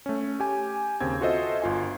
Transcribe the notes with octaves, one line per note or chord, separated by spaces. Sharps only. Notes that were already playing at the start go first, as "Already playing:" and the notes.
A3 C#4
G4 G#5
D#2 C#3 C4 G#6
F4 F#4 A4 C5 D#5 E5
G1 F4 G#5 G#6